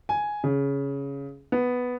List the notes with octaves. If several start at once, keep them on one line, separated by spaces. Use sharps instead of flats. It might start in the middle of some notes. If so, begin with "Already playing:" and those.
G#5
C#3
B3